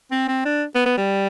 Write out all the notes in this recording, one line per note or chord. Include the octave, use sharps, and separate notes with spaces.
C4
C4
D4
B3
B3
G3